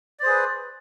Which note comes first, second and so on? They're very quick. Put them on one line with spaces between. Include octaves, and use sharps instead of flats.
D5 C5 G#4 B4